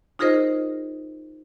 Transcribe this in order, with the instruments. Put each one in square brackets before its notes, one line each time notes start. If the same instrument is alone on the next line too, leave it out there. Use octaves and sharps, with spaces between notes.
[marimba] D#4 F4 G#4 A#4 C5 D#5